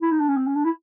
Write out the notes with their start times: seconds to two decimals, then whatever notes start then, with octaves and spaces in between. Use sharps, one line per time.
0.02 E4
0.11 D#4
0.20 D4
0.28 C#4
0.37 C4
0.47 C#4
0.55 D4
0.65 E4